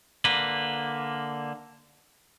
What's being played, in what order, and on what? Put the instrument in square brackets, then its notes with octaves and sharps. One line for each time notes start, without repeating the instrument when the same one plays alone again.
[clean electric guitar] D3 A#3 B4